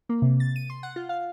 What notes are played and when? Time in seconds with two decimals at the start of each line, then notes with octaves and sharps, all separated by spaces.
0.09 A#3
0.22 C3
0.40 A6
0.56 D#7
0.70 C6
0.83 F#5
0.96 F4
1.09 F5